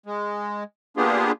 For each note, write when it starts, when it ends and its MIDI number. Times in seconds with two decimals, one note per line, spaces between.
0.06 0.63 56
0.97 1.31 58
0.97 1.31 59
0.97 1.31 62
0.97 1.31 65
0.97 1.31 67
0.97 1.31 68